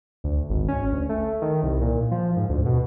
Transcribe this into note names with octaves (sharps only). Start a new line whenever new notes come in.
D2
G#1
C#4
D2
A3
D#3
C2
A#2
F3
G#2
D2
B2